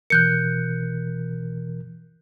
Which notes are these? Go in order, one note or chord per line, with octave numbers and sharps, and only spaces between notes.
B2 E3 A#4 F#6 G6 C#7